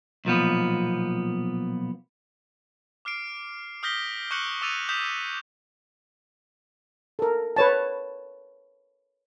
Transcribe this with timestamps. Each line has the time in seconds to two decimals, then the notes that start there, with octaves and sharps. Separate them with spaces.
0.25 B1 A#2 F3 B3
3.05 D6 F6 C7 D7
3.83 D#6 F6 G6 A#6 B6 G7
4.31 C#6 D6 F#6 G6 C#7 F#7
4.62 D6 E6 A6 D#7 F7
4.89 D#6 G6 B6 E7 F7
7.19 A4 A#4
7.56 B4 C#5 A5